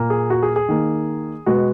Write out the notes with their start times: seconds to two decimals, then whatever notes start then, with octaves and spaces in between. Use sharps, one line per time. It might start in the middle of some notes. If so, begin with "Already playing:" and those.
Already playing: A#2 A#3
0.10 G#4
0.30 F#4
0.43 G#4
0.56 G#4
0.69 D#3 A#3
1.46 B2 G#3 B3 F#4